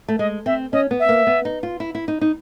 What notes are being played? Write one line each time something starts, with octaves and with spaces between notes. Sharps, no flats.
A3
G#3 D#5
C4 E5
C#4 D#5
B3
E5
A#3
B3
D#4
F4
E4
E4
D#4
D#4